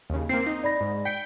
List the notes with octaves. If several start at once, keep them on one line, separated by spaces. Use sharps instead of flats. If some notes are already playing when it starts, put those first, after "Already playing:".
D#2 C#3
A#3 C4 C7
D#4
D5 B5 A#6
G#2
G5 B6 C#7